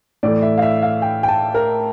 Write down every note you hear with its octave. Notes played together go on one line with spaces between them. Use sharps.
A2 E3 A3 D5
E5
F5
E5
F5
G5
G5
A5
A#4